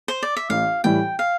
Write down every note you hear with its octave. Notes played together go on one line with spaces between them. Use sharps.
C5
D5
E5
A1 F5
A2 E3 G3 G5
F5